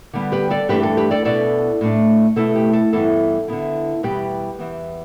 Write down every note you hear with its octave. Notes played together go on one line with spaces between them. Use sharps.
D3 G3 B3
G4 B4
A4 D5
G2 E3 A3 D4 G4 B4
A4
G4 B4
A4 D5
B2 B3 E4 A4 D5
A2 A3 D4
B2 A3 E4 A4
G4
A4
G2 E3 B3 E4 A4
D3 B3 E4
E2 B2 G3 B3 E4 G4 B4
E2 E3 B3